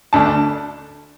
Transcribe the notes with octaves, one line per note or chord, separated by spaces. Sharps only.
D2 D3 A3 D4 A5